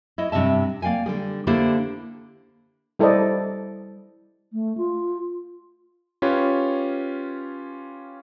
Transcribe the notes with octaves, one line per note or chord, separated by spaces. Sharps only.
E4 C#5 D#5
G2 C3 D#5 E5 A5
A#3 D5 F5 G5 G#5
D3 G3 G#4
D3 A#3 D4 E4 G4 C5
G3 E4 A4 C5 D5 D#5
A3
F4
C#4 F4 G4 B4 C#5